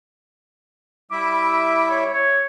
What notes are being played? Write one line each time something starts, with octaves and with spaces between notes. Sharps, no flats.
G3 E4 E5 D6
C#5
C#5